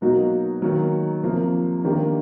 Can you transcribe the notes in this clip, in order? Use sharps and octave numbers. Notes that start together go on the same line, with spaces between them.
B2 F#3 A#3 D#4 F#4
D#3 F#3 A#3
C3 F3 A#3
D#3 G3 A#3 D4 G4